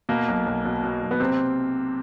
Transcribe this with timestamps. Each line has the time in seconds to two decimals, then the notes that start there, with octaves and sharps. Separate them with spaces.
0.09 B2 A#3
0.28 B1
0.46 B1
0.65 B2
0.84 B2
1.02 B1
1.11 B3
1.20 C3 C4